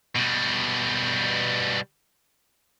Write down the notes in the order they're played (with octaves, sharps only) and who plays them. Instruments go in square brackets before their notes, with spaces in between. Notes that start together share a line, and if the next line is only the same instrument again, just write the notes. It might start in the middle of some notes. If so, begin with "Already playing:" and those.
[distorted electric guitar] B2 G3